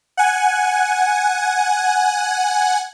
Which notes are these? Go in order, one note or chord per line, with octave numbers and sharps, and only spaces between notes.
F#5 G#5